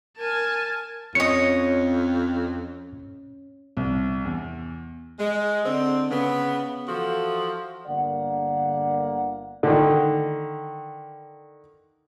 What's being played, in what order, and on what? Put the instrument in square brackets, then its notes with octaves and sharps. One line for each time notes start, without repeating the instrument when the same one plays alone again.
[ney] A#4 [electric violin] G#5 A5
[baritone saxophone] F2 [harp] C#4 [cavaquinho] C#5 D#5 [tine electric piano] C#7
[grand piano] C2
E2
[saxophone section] G#3
D3 C4
C#3 B3
E3 F3 F#4 A4
[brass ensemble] G1 D3 A#3 D5 F#5
[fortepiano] D3 D#3